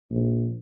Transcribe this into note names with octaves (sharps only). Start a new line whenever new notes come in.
A#1